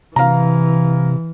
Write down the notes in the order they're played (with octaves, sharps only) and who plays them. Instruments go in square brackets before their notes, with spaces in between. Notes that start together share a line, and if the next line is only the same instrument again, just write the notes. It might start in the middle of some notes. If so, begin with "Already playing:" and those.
[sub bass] C3 [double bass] E3 [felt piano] F5 A#5